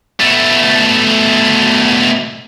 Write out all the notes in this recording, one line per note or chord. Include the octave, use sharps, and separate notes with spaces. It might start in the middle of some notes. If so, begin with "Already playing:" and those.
B2 A3